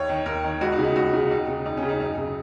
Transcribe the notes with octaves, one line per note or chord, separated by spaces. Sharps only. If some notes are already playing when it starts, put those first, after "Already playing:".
Already playing: D#2 C#5
D#3
D#2 A#4
D#3
C#2 F#4
D#4
C#3
D#4
C#2 F#4
C#3
D#2 D#4
C#3
D#2 D#4
C#4
C#3
D#4
F#2 D#4
C#3